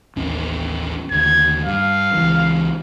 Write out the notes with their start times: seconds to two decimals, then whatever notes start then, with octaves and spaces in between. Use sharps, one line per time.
0.16 A1 D#2 C#4
1.11 D#2 D3 G#6
1.66 G2 F5
2.14 C#2 E3